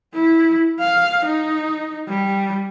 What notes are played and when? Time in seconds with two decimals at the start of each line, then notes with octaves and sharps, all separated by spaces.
0.14 E4
0.80 F5
1.25 D#4
2.09 G3